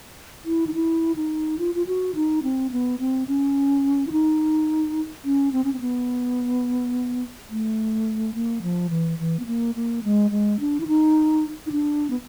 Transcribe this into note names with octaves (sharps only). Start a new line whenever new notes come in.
E4
D#4
E4
D#4
F4
F4
F#4
D#4
C4
B3
C4
C#4
E4
D#4
C#4
C4
C#4
C4
B3
A3
A#3
F3
E3
E3
B3
A#3
A#3
G#3
G#3
D4
E4
D#4
D#4
D4
B3